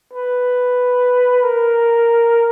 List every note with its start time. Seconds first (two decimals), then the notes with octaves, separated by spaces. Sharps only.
0.13 B4
1.44 A#4